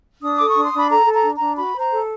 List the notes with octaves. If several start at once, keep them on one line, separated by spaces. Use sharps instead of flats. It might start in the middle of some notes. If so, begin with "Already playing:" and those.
D4 D#6
A4 D6
C#6
D4
C6
D4 B5
A4 A#5
A4
A#5
D4
A#5
D4
F#4 B5
C5
A#5
A4